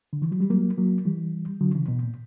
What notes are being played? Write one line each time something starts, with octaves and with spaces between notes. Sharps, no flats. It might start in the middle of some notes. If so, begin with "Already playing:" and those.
D3
E3
F#3
G3
F#3 A#3
F#3 A#3
E3 G3
D3 F#3
C#3 E3
B2
A#2